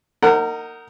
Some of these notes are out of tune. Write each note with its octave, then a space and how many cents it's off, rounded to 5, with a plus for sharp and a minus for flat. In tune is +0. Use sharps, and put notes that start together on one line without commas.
D#4 +0 A#4 -30 F#5 +5